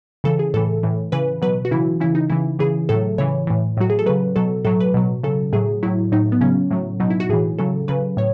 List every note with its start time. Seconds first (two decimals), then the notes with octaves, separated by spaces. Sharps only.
0.24 C#3 E3 A4
0.39 G#4
0.54 A2 E3 A4
0.83 A2 E3
1.12 C#3 E3 B4
1.42 B2 F#3 B4
1.65 F#4
1.71 C#3 E3 E4
2.00 C#3 E3 E4
2.15 D#4
2.30 C#3 E3 E4
2.59 C#3 E3 G#4
2.89 A2 F#3 A4
3.18 C#3 E3 C#5
3.47 A2 E3
3.77 A2 F#3 F#4
3.90 G#4
3.99 A4
4.06 C#3 F#3 B4
4.36 B2 F#3 A4
4.65 A2 F#3 A4
4.80 B4
4.94 B2 F#3
5.23 C#3 F#3 A4
5.53 A2 F#3 G#4
5.83 A2 F#3 E4
6.12 A2 F#3 D#4
6.32 B3
6.41 C#3 F#3 C#4
6.71 A2 F#3
7.00 B2 F#3 D#4
7.10 E4
7.20 F#4
7.29 A2 E3 G#4
7.59 C#3 F#3 A4
7.88 C#3 F#3 B4
8.17 A2 C#5